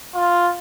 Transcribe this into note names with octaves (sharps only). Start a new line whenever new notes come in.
F4